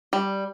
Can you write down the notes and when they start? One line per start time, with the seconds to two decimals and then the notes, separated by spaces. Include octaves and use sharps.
0.13 G3